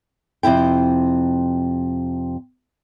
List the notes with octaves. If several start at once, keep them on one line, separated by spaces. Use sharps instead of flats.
F2 C3 E4 G5